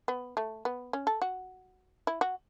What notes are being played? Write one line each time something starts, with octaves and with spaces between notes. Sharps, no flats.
B3
A3
B3
C#4
A4
F#4
E4
F#4